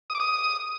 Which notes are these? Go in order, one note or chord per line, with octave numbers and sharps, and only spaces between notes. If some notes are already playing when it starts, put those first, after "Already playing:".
D#6
D6
D#6